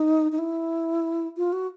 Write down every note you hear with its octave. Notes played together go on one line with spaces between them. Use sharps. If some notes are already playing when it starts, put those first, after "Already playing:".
Already playing: D#4
D#4
E4
F4
F#4